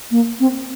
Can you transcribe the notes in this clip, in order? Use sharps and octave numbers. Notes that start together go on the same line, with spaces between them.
A#3
C4